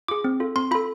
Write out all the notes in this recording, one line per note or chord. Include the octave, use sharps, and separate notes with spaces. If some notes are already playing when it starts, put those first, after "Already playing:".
F4 G#4 D6
C4
F4 A4
C4 C6
F4 A4 B5